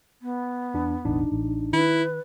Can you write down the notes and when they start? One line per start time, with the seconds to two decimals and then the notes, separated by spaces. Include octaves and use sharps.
0.22 B3
0.74 E2 D4
1.05 E1 A1 D4 D#4
1.32 A1
1.73 D#3 E4 B4